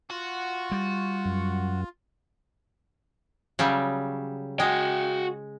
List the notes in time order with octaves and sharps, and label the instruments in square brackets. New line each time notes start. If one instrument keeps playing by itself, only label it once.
[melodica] F4 [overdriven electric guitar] F#4
[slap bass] G3
[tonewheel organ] F#2
[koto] C#3 F#3 G3
[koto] G#3 [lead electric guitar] F#4 G5